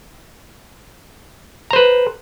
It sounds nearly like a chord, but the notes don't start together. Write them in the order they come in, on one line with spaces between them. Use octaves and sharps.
A#5 C5 B4